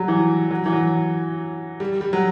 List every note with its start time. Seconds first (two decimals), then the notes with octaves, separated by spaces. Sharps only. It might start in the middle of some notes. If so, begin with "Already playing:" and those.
Already playing: F#3 G3
0.08 E3
0.51 F#3
0.66 E3
0.73 F#3
1.80 G3
2.01 G3
2.13 F#3